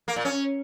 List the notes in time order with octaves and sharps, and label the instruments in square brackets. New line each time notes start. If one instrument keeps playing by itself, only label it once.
[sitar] A#3
A#2
C#4